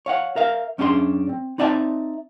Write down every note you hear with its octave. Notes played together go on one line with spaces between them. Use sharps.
C#5 F5 F#5
A#4 E5 F5
F#2 C#4 D4 G4 G#4 C6
C4
C4 D#4 D5 E5 F5 A5